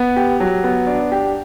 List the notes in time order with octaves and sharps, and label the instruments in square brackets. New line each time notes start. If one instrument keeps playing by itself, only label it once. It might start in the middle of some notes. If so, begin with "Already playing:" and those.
Already playing: [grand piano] B3
G4
F#3
B3
D4
G4